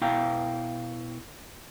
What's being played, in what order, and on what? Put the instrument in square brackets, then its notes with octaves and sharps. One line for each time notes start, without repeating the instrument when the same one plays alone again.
[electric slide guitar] B2 E4 F5 G5 A#5